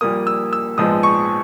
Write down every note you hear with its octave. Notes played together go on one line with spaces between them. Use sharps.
A#1 A#2 G3 A#3 D#6
E6
E6
A#1 G#2 F3 G#3 B3 D#6
C#6